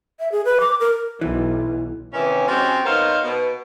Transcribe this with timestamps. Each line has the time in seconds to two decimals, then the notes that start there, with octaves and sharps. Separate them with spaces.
0.20 E5
0.32 G#4
0.45 B4
0.60 D6
0.80 A#4
1.21 B1 E3
2.13 G#2 C3 D#3 E3 C#4
2.48 F3 G#3 C4 C#4 F#4 G4
2.85 B3 D#4 A#4 C5 C#5 F5
3.24 B2